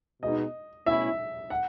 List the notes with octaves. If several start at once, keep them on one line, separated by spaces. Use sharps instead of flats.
B2 G#3 D#4 D#5
B2 A3 C#4 E4 E5
F#5